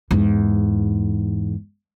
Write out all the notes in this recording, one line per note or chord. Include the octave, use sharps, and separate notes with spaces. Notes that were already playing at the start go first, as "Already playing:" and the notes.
E2 G#2